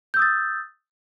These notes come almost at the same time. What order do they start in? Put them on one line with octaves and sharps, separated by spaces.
G6 E6 D#6 A6